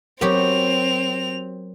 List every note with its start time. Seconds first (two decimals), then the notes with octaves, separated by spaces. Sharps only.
0.21 F#3 B3 C4 G4 A#4 C#5 F7